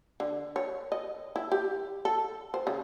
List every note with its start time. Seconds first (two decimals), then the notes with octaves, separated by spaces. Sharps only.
0.20 D3
0.56 C#5
0.92 D#5
1.36 E4
1.52 G4
2.05 A4
2.54 C5
2.67 C#3